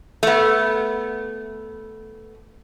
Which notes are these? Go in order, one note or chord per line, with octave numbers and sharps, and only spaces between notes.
A3 B3